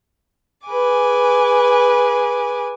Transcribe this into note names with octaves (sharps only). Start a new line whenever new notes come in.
G#4 B4 G#5 D6